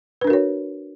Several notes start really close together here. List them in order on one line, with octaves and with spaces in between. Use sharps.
B4 D4 A#4 F#4 C#5